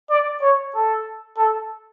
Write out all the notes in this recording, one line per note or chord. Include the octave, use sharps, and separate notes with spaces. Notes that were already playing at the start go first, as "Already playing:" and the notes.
D5
C#5
A4
A4